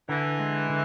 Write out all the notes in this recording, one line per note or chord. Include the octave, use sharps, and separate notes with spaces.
D3 E3
G#3
D3